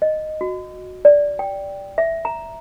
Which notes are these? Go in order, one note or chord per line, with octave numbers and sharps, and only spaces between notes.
D#5
F#4
D5
G5
E5
A#5